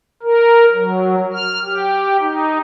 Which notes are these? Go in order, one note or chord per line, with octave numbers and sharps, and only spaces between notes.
A#4
F#3
F6
G4
D#4